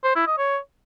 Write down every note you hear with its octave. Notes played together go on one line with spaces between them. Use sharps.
C5
E4
D#5
C#5